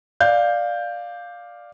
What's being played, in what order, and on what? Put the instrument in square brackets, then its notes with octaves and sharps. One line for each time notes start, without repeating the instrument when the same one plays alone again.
[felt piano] D5 F5 G6